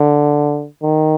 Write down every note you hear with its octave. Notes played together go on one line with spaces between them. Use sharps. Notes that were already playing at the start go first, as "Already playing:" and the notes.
Already playing: D3
D#3